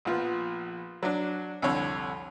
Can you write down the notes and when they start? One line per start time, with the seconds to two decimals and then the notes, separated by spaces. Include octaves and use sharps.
0.05 A#1 F3 B3
1.03 F#3 D4
1.62 C2 F2 D3 C#5